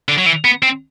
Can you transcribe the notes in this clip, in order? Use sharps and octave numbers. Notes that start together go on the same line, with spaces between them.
D3
F#3
E3
B3
C4